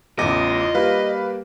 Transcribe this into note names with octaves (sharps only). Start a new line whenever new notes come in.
A1 E2 A2 C#3 F4 D#5 D6 A#6
G3 A#3 B4 F5 B5